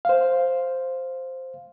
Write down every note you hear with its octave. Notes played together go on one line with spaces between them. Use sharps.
C5 F5